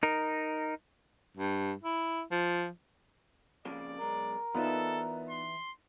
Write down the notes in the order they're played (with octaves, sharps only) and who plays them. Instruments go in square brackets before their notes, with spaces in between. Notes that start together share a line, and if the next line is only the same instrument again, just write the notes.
[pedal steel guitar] D#4 A#4
[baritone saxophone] G2
E4
F3
[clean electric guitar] F2 C#3 A#3 [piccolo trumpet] D5
[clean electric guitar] B1 G#3 [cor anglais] A#4
[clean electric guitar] E3 D5 E5 [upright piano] B3 D#4 F4 [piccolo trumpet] A4
[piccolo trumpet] C6